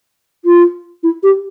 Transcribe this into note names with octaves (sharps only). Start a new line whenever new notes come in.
F4
E4
G4